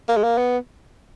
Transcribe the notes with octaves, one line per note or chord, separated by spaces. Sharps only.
A#3
G#3
A#3
B3